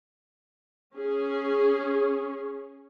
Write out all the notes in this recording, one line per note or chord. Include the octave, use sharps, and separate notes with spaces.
C#4 G#4